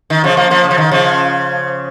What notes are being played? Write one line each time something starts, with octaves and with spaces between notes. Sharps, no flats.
D#3
C#3 F3
F3 A#3
F3 A#3
C#3
F3
D#3
C#3 F3